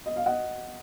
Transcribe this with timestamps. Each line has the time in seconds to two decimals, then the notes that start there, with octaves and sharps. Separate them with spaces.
0.06 D#5
0.16 F5
0.26 D#5 F#5